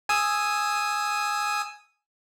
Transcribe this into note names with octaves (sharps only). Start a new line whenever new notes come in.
G#5 D#6 E6